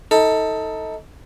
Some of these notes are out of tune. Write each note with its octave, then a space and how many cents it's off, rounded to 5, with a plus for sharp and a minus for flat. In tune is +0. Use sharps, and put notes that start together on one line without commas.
D#4 +35 A4 +15